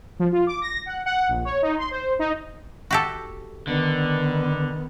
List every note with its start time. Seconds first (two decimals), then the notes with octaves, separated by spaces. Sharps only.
0.20 F3
0.32 F4
0.47 D6
0.62 A#6
0.86 F#5
1.06 F#5
1.29 A#1
1.45 C#5
1.62 D#4
1.78 C6
1.91 C5
2.19 D#4
2.91 F#4 G4 A4
3.67 D3 D#3 B3